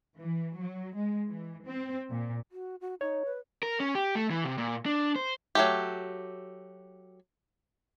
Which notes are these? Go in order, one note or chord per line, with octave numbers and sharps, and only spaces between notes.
E3
F#3
G#3
E3
C4
A#2
F#4
F#4
D#4 C#5
B4
A#4
C#4
G4
A3
E3
C3
A#2
D4
C5
F#3 A3 G4